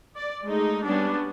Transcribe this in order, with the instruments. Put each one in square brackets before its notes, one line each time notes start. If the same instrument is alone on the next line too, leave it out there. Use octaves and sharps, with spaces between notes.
[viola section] D5
G#3 A3 D#4
G3 B3 C#4 D4